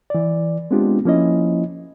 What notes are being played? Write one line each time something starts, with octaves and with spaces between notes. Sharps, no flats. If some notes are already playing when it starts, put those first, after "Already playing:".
E3 D5
G#3 B3 C4 D4 F4 G4
F3 A#3 C#4 E4 D#5